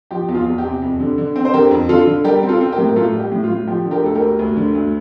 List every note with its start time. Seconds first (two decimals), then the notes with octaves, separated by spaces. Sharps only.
0.11 F3 G4
0.28 E2
0.34 F4
0.47 E2
0.58 G4
0.64 C3
0.82 F2
1.00 D3
1.18 D3
1.36 C4
1.45 C5
1.54 D3 G4 A#4
1.71 F2
1.89 D3 F4 A4
2.07 D3
2.24 G3 G4 A#4
2.43 C4
2.49 F4 A4
2.61 C4
2.72 G4 A#4
2.78 A2
2.88 A#4
2.96 A2 F4 A4
3.14 G3
3.20 G4
3.32 A2
3.44 F4
3.50 A2
3.67 F3 G4
3.86 D3
3.91 G4 A#4
4.03 D2 A4
4.15 G4 A#4
4.21 D2
4.39 D2
4.57 D3
4.75 D2